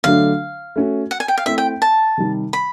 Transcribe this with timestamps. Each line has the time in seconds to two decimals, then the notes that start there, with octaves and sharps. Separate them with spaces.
0.04 D3 F#3 A3 D4 F5
0.76 A3 C#4 F#4
1.11 F#5
1.20 G#5
1.28 G5
1.38 F5
1.46 A3 C4 E4 E5
1.58 G5
1.82 A5
2.18 C3 D#3 G3
2.53 B5